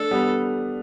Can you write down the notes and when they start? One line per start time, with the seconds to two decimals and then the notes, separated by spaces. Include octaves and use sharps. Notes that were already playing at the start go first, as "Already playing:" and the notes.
Already playing: A3 D4 A4
0.11 G3 B3